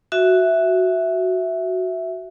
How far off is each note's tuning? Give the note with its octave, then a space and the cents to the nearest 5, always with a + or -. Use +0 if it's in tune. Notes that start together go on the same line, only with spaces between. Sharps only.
F#4 +0 E5 +0